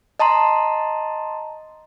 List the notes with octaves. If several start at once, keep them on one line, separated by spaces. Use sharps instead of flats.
D#5 A5 A#5 C6